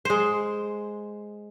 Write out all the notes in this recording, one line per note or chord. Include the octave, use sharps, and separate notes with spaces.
G#3 C5